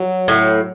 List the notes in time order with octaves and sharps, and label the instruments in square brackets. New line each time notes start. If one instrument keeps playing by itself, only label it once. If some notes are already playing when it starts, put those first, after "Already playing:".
Already playing: [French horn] F#3
[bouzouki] A2